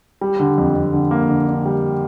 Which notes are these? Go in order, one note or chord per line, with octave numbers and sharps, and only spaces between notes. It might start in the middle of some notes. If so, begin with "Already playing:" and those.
G3
D3
F2
F2
D3
A#3
D3
D3
G3